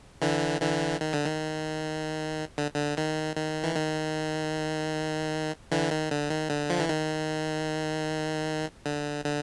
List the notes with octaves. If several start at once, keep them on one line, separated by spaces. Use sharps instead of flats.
D3 E3
D3 E3
D#3
D3
D#3
D3
D3
D#3
D#3
E3
D#3
D3 E3
D#3
D3
D#3
D3
F3
E3
D#3
D3
D3